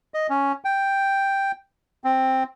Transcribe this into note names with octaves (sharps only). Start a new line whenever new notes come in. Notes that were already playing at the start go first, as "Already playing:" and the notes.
D#5
C#4
G5
C4